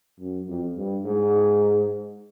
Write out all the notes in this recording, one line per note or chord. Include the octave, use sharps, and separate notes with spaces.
F#2
F2
G2
G#2